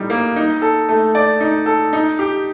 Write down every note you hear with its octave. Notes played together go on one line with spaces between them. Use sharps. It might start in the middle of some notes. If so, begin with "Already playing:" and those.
Already playing: A2 G3 D#4
A#3
D#4
A4
A3
D5
D#4
A4
D#4
G4